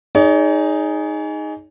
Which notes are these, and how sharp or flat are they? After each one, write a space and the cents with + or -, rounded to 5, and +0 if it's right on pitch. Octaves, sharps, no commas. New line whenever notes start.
D#4 +0 G#4 +0 C#5 +45